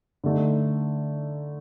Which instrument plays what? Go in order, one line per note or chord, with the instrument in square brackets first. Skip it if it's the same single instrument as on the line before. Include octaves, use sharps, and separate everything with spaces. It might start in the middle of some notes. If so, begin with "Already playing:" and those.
[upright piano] D3 A3 D#4